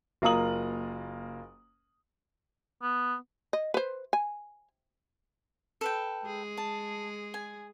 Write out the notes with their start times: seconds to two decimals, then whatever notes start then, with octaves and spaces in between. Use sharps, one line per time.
0.22 F#1 A#3 F4 A#5 D#6 F#7
2.82 B3
3.53 D#5
3.74 B4 C5
4.13 G#5
5.81 A4 B4 G5
6.25 G#3 G#4
6.57 A5
7.34 G#5